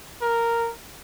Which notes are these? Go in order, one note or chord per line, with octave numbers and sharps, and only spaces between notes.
A#4